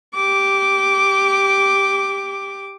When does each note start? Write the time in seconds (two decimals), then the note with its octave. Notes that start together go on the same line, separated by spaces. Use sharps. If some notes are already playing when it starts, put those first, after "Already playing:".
0.15 G4 D6